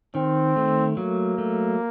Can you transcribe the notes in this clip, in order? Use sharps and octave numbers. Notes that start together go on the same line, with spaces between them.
D#3 C4
A3
F#3 A#3
A3